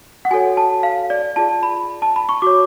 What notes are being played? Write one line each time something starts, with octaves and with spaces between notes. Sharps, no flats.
F#5
F#4 A4 C#5 G#5
A5
F5
D5
F4 G#4 D5 A5
B5
A5
B5
C#6
F#4 C#5 D6